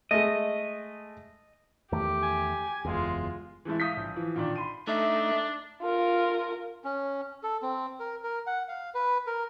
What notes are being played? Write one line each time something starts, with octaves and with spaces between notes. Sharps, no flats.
G#3 A3 D#5
E2 D#3 A3 G4
G#5
F#1 E2 G#3 F4
E3 G#3 A3 E4
E5 F5 D#6 G6 B6
A#1
E3 F3
A#2 D#3 D4
B5 C6 D#7
A3 D4 D#4 E5
F4 A#4
C#4
A4
C4
A#4
A#4
F#5
F5
B4
A#4